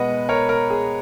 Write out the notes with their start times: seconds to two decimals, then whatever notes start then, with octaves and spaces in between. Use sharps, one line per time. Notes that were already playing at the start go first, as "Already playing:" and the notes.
Already playing: B2 G#3 B4 D#5 F#5
0.29 A#4 C#5
0.49 A#4
0.70 G#4